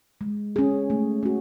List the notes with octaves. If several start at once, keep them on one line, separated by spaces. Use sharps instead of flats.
G#3
C#4 G#4
A3
C#4 F#4